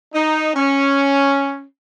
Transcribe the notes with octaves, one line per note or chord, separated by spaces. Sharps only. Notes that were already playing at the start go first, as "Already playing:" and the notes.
D#4
C#4